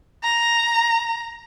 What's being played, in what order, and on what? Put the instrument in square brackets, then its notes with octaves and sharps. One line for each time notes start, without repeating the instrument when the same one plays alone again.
[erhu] A#5